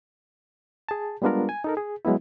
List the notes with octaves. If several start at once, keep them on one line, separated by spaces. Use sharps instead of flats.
G#4 A5
G3 G#3 B3 D4 F4 A#4
G#5
D#4 A4 A#4
G#4
F#3 G#3 B3 E4